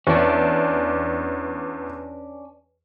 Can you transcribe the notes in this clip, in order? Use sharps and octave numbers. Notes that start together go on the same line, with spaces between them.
E2 C#4 D4